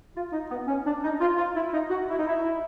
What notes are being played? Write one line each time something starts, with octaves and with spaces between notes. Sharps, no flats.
F4
D#4
B3
C#4
D4
D#4
F4
F4
E4
D#4
F#4
E4
D#4
E4